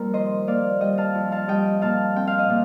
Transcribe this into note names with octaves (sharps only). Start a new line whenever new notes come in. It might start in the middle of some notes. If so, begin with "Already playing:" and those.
Already playing: F2 G3 A#3 A#4
D#3 C5 D#5
A#3 D5 F5
G3 D#5 G5
F5 A5
F2
F5 A5
G3 D#5 G5
A#2 F5 A5
C4 G5
F5
D#5
A#2